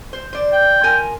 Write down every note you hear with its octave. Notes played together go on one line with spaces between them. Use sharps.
C5
C5 D5
G5
F3 A#4 G#5